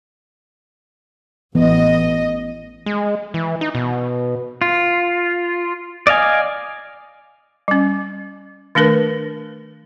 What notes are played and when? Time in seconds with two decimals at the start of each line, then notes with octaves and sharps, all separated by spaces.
1.55 A1 E3 B3 D#5
2.86 G#3
3.34 E3
3.61 D#4
3.75 B2
4.62 F4
6.07 D5 D#5 F5 G#5
7.68 G3 C#4
8.75 D#3 A3 D4 A#4 B4